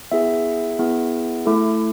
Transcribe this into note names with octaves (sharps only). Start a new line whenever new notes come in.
B3 E4 G#4 E5
B3 E4 G#4
A3 E4 A4